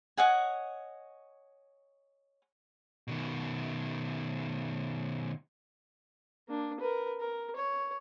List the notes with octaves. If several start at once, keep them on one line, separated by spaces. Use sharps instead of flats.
C#5 D#5 F#5 G#5
B2 D#3
A#3 D4
A#4 B4
A#4
C#5